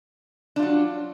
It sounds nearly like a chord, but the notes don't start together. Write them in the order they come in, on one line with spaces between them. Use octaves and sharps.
D4 F4 F#3